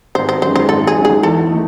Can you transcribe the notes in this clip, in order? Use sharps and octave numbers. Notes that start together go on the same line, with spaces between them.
G#1 C5
C5
F#2 D#3 G#3 C5
C5
G#1 A4
G#4
F#2 D#3 G#3
G#4
E2 A4
D#3 A3 D#4